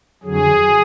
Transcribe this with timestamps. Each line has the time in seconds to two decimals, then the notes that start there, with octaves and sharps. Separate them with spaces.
0.24 F2 D3 F#3 G#4